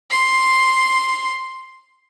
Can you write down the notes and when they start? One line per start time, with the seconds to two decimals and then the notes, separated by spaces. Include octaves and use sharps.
0.10 C6 C7